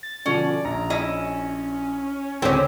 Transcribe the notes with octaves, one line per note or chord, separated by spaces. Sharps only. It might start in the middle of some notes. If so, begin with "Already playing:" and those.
A6
B2 D3 F3 C#4 D5
A#1 A#5
C#4 E4 D#5
C#2 D3 C4 C#4 E4 D6